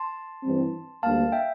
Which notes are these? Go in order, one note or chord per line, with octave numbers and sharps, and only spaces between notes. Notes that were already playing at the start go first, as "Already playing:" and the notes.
Already playing: A5 C6
G2 E3 G3 C4
D2 D3 G3 A#3 F5 A5
E5 G5